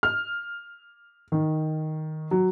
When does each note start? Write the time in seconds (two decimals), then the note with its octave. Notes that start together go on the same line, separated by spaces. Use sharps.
0.03 F6
1.32 D#3
2.31 F#3